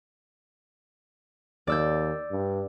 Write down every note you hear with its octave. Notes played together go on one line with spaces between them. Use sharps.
D#2 D5 E6 G6
G2